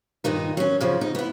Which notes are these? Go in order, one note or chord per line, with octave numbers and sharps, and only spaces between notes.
G2 A#2 D#3 D#4
F#3 C#4
F#2 C#3 F3
D#4
B3 E4